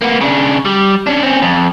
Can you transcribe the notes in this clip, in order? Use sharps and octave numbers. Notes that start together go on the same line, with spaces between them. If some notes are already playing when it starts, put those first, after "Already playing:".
A#3 B3
C#3 D4
G3
C#4 D4
C4 C#4
F2